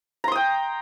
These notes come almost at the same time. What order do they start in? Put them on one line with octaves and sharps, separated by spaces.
A#5 C6 D#6 G5